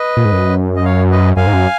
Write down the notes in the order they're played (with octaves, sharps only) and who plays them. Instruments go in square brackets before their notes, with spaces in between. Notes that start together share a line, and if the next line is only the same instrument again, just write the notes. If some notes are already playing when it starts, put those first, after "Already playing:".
Already playing: [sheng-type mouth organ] B4 D#5
[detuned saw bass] A#2
G#2
F#2
[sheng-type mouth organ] D#5
C#5 F5
B4 D#5
[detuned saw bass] F#2 [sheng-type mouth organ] F5 G#5
[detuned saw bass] G#2
F#2